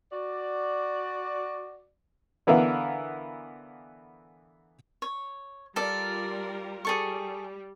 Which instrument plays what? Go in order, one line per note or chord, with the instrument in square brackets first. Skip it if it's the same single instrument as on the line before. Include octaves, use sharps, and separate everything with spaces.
[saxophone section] F#4 D5
[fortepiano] D3 E3 B3 A#4 E5 F5
[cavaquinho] C#5
[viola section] G3 F4 A#4 [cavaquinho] A4 D5
[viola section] G3 [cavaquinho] G#4 A4 C#6